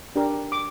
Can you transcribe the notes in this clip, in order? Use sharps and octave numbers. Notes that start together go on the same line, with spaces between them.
D4 G4 A#4
D6